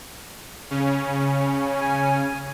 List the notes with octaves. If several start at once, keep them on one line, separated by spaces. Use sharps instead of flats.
C#3 C#4
G#5